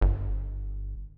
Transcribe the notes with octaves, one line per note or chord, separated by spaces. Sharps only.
G1